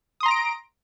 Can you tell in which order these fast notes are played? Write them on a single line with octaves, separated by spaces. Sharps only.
D#6 C6 A#5 A#6 D7